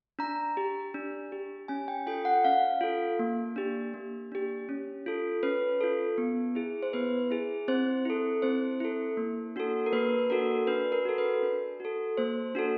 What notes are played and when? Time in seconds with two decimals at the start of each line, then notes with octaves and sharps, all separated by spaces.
0.19 D4 A#5
0.57 G4
0.94 D4
1.32 G4
1.68 C#4 G#5
1.88 G5
2.07 F4 A4 G5
2.25 F#5
2.44 C#4 F5
2.81 F4 A4
3.19 A#3
3.56 D4 G4
3.94 A#3
4.32 D4 G4
4.69 C#4
5.06 F4 A4
5.43 C#4 B4
5.81 F4 A4
6.18 B3
6.55 E4 G#4
6.83 C5
6.93 B3 B4
7.31 E4 G#4
7.68 C4 C5
8.05 E4 A4
8.42 C4 C5
8.80 E4 A4
9.17 A#3
9.56 D4 F#4 A4
9.86 A#4
9.93 A#3 B4
10.30 D4 F#4 A4 A#4
10.67 D4 B4
10.92 A#4
11.05 F#4 A4
11.18 B4
11.43 D4
11.80 F#4 A4
12.17 A#3 C5
12.55 D4 F#4 A4